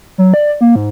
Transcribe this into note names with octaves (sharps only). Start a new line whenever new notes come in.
F#3
D5
A#3
G#2